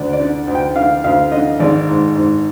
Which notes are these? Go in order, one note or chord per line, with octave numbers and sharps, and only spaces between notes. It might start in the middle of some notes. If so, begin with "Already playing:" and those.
Already playing: D2 D5
D5
D3
D2
G5
D3 F5
D2 F5
D3 D#5
G#1 D5
G#2
G#2